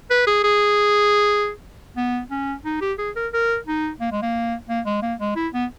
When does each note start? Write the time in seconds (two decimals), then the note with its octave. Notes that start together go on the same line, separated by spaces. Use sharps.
0.10 B4
0.27 G#4
0.44 G#4
1.97 B3
2.30 C#4
2.64 D#4
2.81 G4
2.98 G#4
3.16 A#4
3.33 A#4
3.66 D#4
4.00 A#3
4.12 G#3
4.22 A#3
4.68 A#3
4.86 G#3
5.02 A#3
5.20 G#3
5.36 E4
5.54 B3